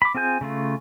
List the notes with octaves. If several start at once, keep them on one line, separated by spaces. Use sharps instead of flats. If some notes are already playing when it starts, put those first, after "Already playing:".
B5 D6
C4 F4 G#4 G#5 G6
C#3 A3 F4